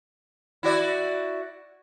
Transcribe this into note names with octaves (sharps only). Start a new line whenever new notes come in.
E4 F#4 D5